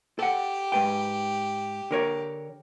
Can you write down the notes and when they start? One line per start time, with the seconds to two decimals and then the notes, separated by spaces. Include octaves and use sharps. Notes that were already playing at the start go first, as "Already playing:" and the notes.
0.19 G4 A4 F#5
0.72 G#2 B4 G5
1.91 D3 A#4 C#5